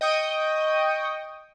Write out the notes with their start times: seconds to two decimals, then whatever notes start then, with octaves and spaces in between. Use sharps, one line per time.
0.01 D#5 G5 C#6 D#6